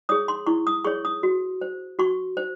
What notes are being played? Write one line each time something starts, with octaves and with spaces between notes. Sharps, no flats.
G#4 C#5 D#6
C6
E4 C#6
D#6
G#4 C#5 C#6
D#6
F#4
C5
F#4 C#6
C5